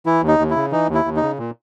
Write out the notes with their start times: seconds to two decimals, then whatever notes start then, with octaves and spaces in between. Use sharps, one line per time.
0.06 E3 E4
0.22 D#2
0.28 D#4
0.39 D#2
0.50 E4
0.56 C#3
0.71 E3 D#4
0.89 D#2
0.94 E4
1.05 D#2
1.16 D#4
1.22 C#3
1.38 A#2